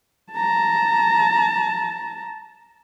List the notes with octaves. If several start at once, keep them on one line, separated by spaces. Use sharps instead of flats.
A5 A#5